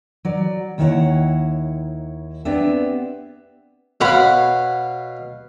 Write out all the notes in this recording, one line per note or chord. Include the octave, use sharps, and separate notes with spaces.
F#3 D5
D#2 D#3 E4 F#4 C#5 F#5
B3 C4 D4 G4 G#4 E5
B2 C#5 F5 F#5 B5